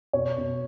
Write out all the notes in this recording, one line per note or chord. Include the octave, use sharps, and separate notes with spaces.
B2 C#5
B2